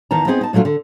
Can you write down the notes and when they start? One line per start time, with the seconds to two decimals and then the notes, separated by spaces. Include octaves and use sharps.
0.11 E2 D#3 A5 A#5
0.27 B3 C4 D#4 G#4
0.41 D#4 A5
0.53 A#2 F#3 A3 D4 F4
0.65 D3